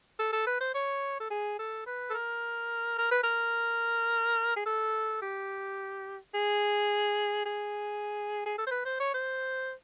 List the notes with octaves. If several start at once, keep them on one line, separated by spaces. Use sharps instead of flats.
A4
A4
B4
C5
C#5
A4
G#4
A4
B4
A4
A#4
A#4
B4
A#4
G#4
A4
G4
G#4
G#4
G#4
A4
C5
B4
C5
C#5
C5